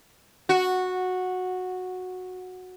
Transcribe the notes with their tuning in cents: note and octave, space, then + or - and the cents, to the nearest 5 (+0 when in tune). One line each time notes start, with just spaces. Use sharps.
F#4 -10